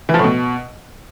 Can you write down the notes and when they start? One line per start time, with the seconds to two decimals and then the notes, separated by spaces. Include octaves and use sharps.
0.09 E3
0.14 F3
0.19 A2
0.24 B2